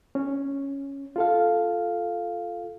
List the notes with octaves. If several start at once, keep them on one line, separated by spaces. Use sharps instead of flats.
C#4
F4 A4 F5